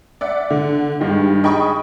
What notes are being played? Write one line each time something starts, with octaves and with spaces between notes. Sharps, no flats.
D5 E5 F#5
D3
G2 D#3 G#3 G4
G#4 D#5 G5 B5 C#6 D#6